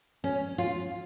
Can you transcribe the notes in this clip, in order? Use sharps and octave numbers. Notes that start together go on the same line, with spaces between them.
C#4
F4